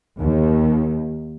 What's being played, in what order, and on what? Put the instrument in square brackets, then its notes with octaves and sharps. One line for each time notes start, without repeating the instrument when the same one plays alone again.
[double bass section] D#2